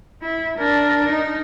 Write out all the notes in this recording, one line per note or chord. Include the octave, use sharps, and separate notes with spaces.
E4
D4 A#4
D#4